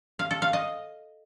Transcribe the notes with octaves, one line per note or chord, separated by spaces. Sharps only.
F5
A4
F5
D#5